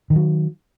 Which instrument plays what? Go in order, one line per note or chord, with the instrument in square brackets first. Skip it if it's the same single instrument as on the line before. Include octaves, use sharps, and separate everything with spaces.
[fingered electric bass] D#3
E3
F#3